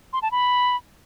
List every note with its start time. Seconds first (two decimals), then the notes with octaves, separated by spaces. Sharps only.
0.13 C6
0.22 A5
0.31 B5